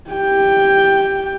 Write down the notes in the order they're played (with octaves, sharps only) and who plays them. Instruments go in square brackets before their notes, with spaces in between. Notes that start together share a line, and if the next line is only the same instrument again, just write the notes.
[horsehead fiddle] G4 G5